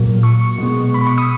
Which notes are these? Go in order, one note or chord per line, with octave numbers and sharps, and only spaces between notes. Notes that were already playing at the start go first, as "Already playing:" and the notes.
Already playing: A#2 F#3 A#3
C#6
B2 G#3 B3
B5
C#6
D#6